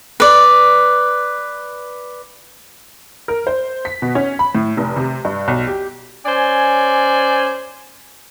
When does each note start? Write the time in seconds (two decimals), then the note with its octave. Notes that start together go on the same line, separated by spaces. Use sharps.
0.20 B4 D5
3.28 A#4
3.47 C5
3.85 B6
4.02 B2
4.15 C#4
4.39 B5
4.55 A2
4.77 F1
4.96 C3
5.25 G2
5.48 B1
5.68 G4
6.26 C#4 C5 D5 G#5